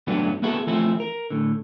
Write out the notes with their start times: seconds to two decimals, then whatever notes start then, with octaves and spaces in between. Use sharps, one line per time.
0.07 G2 E3 F#3 A3 B3 D4
0.42 A#3 B3 E4 F#4 G#4 A4
0.67 E3 F3 A3 C4 E4 F4
1.00 A#4
1.30 A2 D3